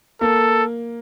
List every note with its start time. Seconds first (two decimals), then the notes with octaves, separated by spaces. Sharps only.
0.21 A#3 A4